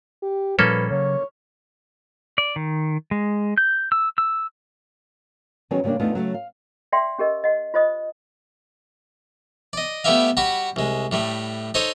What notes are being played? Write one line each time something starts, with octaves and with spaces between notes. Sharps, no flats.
G4
A#2 F3 G3 A#3 C#4 A4 B4
C#3 F#3 C#5
D5
D#3
G#3
G6
E6
E6
D#3 F#3 B3 C#4 G#4 C#5
C#3 F3 G3 A#3 D4
E2 A3 B3 D4 D#4 F4
C#3 F#3 A3
F5
D5 E5 F#5 G5 C6
C#4 G4 A#4 D#5
D#5 F#5
F4 C5 D#5 D#6
D5 D#5
G3 A3 B3 G4 E5 F5
G3 F#4 F#5 B5
C2 G#3
A2 G3 A3
D#4 A4 C5 C#5 D#6